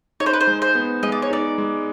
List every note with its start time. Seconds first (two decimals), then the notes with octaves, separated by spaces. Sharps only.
0.20 D#4 C#5
0.26 C5
0.33 B4
0.41 C5
0.47 G#3
0.62 C5
0.75 B3
1.03 G#3 D#5
1.12 D5
1.22 C#5
1.31 D#4 D5
1.58 G#3